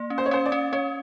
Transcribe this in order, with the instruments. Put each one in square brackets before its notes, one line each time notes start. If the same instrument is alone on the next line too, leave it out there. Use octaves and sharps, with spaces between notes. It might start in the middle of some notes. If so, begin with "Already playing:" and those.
Already playing: [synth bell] A#3
C#4
[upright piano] C5
C#5
[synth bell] C#4 [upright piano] C5
[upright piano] D5
[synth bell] C#4
[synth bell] C#4 [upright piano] C#5